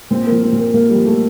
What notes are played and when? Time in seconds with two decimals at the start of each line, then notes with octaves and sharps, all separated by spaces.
0.11 A#2 C4
0.27 F3 A#3
0.43 C4
0.52 A#2
0.59 A#3
0.74 A#2 A#3
0.90 G3
0.95 F3
1.06 A3